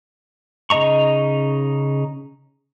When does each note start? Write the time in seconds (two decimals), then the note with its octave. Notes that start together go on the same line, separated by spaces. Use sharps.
0.70 C#3 D#4 D#5 A#5 C#6